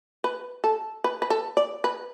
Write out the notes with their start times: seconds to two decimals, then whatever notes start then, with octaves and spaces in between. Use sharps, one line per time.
0.24 B4
0.64 A4
1.04 B4
1.22 B4
1.30 A4
1.57 D5
1.84 B4